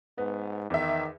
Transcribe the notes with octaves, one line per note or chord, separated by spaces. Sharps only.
G#2 B3
E2 D#3 E5